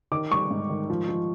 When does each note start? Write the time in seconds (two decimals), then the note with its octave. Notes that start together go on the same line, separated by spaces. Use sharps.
0.12 D#3 D6
0.31 G3 C#6
0.51 G#2
0.70 D#3
0.90 F3
1.09 F3